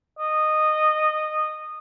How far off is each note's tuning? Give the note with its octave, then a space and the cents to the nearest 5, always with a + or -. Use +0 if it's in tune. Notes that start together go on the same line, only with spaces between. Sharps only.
D#5 -15